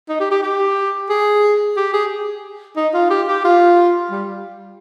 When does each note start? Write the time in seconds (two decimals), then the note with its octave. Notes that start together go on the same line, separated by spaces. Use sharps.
0.09 D#4
0.20 G4
0.31 G4
0.43 G4
1.09 G#4
1.77 G4
1.93 G#4
2.76 D#4
2.94 F4
3.10 G4
3.28 G4
3.45 F4
4.11 G3